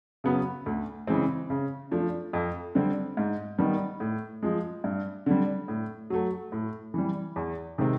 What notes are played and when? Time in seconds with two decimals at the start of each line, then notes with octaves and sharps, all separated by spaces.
0.24 C#3 F#3 B3
0.66 D2
1.07 C#3 E3 G#3 C4
1.50 C#3
1.91 F3 A3 D4
2.33 F2
2.75 D3 G3 C4
3.17 G#2
3.58 D#3 G3 B3
4.00 A2
4.43 F3 G#3
4.84 G2
5.26 D3 G3
5.68 A2
6.10 F#3 A3
6.52 A2
6.94 E3 G3
7.36 E2
7.78 C3 D#3 G#3 C4